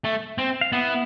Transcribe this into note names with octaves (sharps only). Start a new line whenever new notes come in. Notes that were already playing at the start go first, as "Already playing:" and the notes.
A3
C4
F5
B3 E4 E5